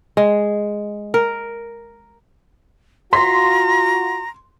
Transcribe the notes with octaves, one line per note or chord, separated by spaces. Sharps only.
G#3
A#4
F4 F#4 A#5 C6 B6